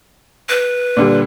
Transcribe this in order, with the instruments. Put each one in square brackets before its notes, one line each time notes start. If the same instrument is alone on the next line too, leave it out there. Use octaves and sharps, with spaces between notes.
[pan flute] B4
[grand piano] A#2 D3 G3